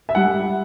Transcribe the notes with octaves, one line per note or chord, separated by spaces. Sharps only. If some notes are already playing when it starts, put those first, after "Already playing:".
E5
G3 F#5